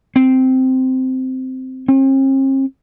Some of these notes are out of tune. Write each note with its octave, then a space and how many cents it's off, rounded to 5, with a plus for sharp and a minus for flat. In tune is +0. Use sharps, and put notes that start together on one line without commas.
C4 -10
C4 +45